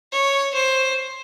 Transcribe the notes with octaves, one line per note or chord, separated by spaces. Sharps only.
C#5
C5